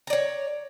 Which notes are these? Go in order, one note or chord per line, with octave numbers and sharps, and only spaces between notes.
C#5 D5 A#5